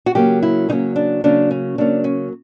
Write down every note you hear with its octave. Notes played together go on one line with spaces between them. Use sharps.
F#4
C#3 F#3 A#3 C#4 G4
E4
C#3 F#3 A#3 C#4 D#4
D4
C#3 F#3 A#3 C#4 D4
C#4
C#3 F#3 A#3 C#4 D4
C#4